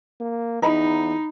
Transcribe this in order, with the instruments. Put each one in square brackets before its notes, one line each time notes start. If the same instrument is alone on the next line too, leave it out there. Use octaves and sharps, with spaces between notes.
[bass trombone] A#3
[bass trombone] E2 [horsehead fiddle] D#4 [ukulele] D#5 A#5 B5